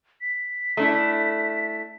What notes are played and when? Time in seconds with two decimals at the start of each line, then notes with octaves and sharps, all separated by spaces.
0.21 B6
0.77 A3 D4 E4